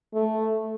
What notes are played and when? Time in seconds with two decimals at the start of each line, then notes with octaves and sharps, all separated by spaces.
0.14 A3